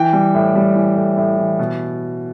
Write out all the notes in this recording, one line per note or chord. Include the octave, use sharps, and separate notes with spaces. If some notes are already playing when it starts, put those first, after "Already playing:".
Already playing: E3 G5
G3
A2
G3
E3
A2
A2
E3
B2